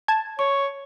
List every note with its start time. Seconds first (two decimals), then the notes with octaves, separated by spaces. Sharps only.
0.08 A5 G#6
0.39 C#5 C#6